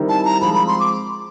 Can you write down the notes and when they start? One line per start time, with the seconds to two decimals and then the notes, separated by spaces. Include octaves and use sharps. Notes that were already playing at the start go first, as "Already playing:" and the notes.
Already playing: D#3 G3 C4 E4
0.09 A5
0.25 A#5
0.41 F3 G#3 C4 B5
0.55 B5
0.67 C6
0.80 D6